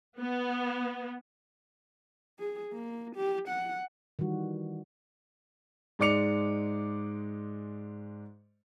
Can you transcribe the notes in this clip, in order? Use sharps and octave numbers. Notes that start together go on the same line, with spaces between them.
B3
G#4
A#3
G4
F#5
D#3 E3 G3 F#4
G#2 G#3 D5 D6 C#7 F7